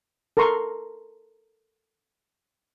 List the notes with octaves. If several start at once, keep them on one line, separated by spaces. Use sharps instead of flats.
A4 A#4 A#5 C6 C#6